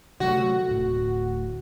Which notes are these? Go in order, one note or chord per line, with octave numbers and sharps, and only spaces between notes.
C3 F#3 A3 F#4
D1 A2